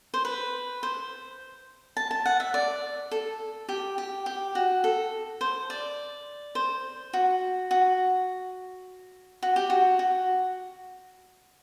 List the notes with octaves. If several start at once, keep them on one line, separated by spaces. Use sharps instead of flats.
C5
B4
C5
A5
A5
F#5
E5
D5
A4
G4
G4
G4
F#4
A4
C5
D5
C5
F#4
F#4
F#4
G4
F#4
F#4